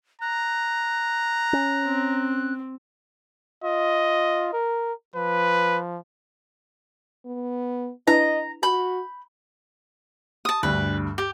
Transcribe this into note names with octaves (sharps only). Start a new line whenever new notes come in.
A#5 F#6
C#4
C4
F4 D#5
A#4
F3 B4
B3
D4 E4 B4 D#5 A#5
F#4 B5 G6
A5 D#6
D2 G2 B4
G4